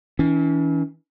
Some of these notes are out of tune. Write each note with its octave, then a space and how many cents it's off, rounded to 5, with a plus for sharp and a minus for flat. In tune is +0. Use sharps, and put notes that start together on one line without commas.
E3 -30 C#4 +30